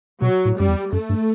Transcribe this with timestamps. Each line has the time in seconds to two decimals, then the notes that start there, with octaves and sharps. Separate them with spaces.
0.22 B2 F#3
0.45 A2
0.57 F#2 G3
0.68 E2
0.92 F#2 A3
1.09 G2